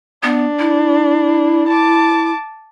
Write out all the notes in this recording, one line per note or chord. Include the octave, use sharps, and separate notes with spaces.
B3 D4
E4
A5 D6